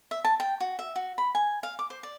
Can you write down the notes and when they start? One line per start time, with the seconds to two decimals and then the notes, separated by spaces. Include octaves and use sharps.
0.11 E5
0.25 A5
0.40 G5
0.60 F#4
0.79 E5
0.96 F#4
1.18 B5
1.35 G#5
1.63 F5
1.79 D6
1.90 C5
2.03 D5